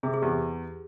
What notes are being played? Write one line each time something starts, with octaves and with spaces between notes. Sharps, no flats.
C3 G#4
G#4
E2 G4